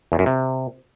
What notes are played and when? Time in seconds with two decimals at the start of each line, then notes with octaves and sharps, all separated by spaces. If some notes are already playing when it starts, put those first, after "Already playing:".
0.12 E2
0.19 F#2
0.26 C3